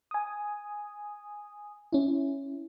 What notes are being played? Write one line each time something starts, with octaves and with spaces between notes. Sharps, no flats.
G#5 D#6
C#4 E4